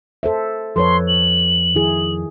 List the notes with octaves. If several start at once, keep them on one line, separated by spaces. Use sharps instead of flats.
A4 C5 E5
F2 A4 B4 C#5 C6
F#7
D#3 E4 G#4